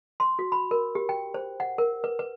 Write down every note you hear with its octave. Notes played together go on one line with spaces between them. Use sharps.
C6
F#4
B5
A#4
G4
G5
C5
F#5
A#4
B4
B4